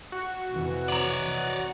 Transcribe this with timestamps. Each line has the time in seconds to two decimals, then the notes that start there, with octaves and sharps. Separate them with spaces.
0.12 F#4
0.51 F2 C3 E3
0.88 C#5 D5 A#5 F#7